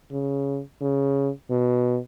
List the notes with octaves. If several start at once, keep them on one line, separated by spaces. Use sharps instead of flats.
C#3
C#3
B2